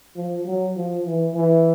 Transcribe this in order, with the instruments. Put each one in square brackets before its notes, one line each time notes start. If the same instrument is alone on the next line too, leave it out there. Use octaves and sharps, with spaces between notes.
[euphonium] F3
F#3
F3
E3
E3